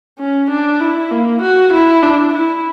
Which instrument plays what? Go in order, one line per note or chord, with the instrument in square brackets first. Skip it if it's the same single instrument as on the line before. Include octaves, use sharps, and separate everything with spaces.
[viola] C#4
D4
E4
A#3
F#4
E4
D4
E4